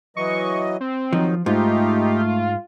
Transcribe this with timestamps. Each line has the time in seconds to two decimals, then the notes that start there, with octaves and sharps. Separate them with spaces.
0.17 E3 F#3 D#5 C#6
0.81 C4
1.13 D#3 F3 F#3 D#4
1.46 G#2 A3 D#4 F4 G4